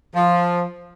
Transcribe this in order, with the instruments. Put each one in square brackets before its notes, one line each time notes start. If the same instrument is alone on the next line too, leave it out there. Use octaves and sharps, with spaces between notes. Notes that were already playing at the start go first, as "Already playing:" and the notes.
[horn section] F3